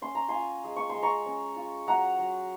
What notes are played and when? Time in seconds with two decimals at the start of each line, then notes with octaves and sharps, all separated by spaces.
0.02 C#4 C6
0.15 A#5
0.29 F4 G#5 C6
0.64 G#3
0.76 C#6
0.89 C6
0.95 G#3
1.03 A#5 C#6
1.26 C#4
1.56 F4
1.87 F#3 F#5 A#5
2.19 F#3